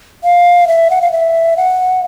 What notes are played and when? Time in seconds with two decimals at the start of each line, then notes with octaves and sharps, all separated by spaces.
0.24 F5
0.68 E5
0.90 F#5
1.02 F5
1.12 E5
1.57 F#5